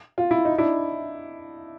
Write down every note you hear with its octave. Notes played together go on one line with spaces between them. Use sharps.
F4
E4
D#4
D4 E4